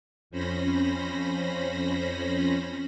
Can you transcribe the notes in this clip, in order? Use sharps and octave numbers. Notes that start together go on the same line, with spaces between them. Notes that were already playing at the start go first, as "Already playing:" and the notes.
F2 C#4 C5 B5 A#6